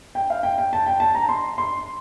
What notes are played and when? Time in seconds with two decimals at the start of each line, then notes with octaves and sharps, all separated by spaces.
0.15 G5
0.30 F5
0.43 G5
0.58 G5
0.73 A5
0.86 G5
1.00 A5
1.15 A#5
1.29 C6
1.58 C6